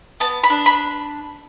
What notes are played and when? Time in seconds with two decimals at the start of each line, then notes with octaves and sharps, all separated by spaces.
0.20 B3 A5
0.44 B5
0.50 D4
0.66 B5